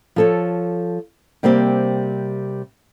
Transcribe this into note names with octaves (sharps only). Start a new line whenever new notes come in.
F3 A4 C#5
C3 G3 A#3 C4 G4